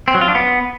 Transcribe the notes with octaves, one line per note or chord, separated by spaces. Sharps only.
C4
F#3
F4
D4
B3